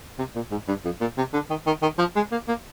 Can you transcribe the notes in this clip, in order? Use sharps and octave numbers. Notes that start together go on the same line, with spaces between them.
C3
A#2
G#2
G2
F2
A#2
C3
D3
D#3
D#3
D#3
F3
G#3
A#3
A#3